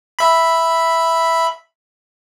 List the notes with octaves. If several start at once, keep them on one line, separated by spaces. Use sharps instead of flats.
E5 B5